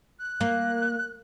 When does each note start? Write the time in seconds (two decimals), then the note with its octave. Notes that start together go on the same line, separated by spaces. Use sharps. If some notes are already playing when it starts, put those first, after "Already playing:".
0.19 F#6
0.41 A#3